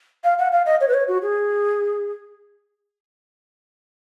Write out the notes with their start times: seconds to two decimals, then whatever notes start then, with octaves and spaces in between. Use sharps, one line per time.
0.24 F5
0.38 F#5
0.52 F5
0.66 D#5
0.80 C#5
0.88 B4
0.94 C#5
1.08 F#4
1.22 G#4